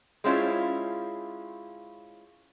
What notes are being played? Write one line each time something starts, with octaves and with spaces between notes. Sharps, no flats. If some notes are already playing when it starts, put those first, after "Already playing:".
G#3 C4 C#4 E4 F4